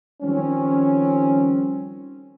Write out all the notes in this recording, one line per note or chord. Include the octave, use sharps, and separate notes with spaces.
D#3 F3 G3 C4 C#4